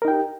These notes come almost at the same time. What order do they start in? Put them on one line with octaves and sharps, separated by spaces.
A#4 D#4 G5 G4